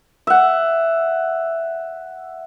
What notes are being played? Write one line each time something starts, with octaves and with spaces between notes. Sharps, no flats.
E5 F#5